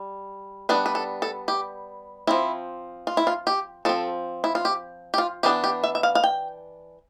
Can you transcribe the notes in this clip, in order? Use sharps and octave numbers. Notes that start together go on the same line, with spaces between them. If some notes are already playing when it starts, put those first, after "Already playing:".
Already playing: G3
G3 B3 D4 B4
B4
A4
A4
G4
F3 C4 E4
F4
E4
F4
G4
F3 C4 A4
E4
F4
G4
G4
F4
E3 B3 D4 G4
G4
E5
E5
F5
F5
G5